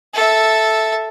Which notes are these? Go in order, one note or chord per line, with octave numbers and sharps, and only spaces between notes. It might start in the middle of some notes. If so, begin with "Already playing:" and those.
A4 E5